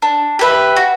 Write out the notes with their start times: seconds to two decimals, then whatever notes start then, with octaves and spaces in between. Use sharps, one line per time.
0.02 D4
0.39 G4 B4 E5
0.76 F#4